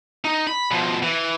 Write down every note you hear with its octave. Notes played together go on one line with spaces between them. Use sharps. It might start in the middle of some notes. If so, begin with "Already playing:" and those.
D#4
B5
B2 F3
E3